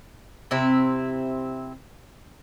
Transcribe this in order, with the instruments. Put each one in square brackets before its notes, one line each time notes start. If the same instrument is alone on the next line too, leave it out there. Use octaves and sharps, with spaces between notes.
[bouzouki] C3 C4 E4